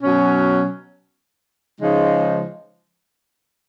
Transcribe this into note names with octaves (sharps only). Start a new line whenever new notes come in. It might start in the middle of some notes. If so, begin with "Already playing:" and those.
B2 F#3 C#4
C#3 F3 G#3 D#4